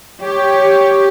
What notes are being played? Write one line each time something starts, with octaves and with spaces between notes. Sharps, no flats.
G4 C#5